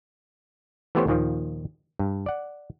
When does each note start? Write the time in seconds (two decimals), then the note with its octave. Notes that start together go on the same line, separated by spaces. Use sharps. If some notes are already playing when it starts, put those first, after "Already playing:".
0.95 E3 A3 B3 G4 C5 C#5
1.07 D#2 A#2 D#3 F3
1.99 G2
2.26 D5 F#5